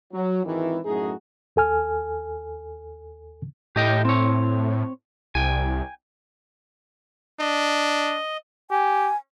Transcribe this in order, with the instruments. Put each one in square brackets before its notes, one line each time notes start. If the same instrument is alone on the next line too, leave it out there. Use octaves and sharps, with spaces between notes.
[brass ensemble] F#3
G#1 D#3 E3
F#2 A2 A3 D#4 F#4 G#4
[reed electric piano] D#2 A4 G#5 F6
[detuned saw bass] A2 [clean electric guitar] G4 D#5 G5
[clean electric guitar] C4 C#5
[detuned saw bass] C2 [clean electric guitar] G5 G#5
[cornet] D4 [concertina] D#5
[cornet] G4 [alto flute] G#5